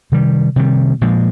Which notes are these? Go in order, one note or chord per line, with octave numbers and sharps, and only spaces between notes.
C3 D#3 G3
C3 D#3 G3
A#2 F3 G#3